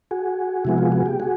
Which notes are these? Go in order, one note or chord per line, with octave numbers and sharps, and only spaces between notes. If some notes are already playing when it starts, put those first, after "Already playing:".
F#4 G#4
C3 F3 G#3 B3 E4
F4
F#4
G4
F#4 G#4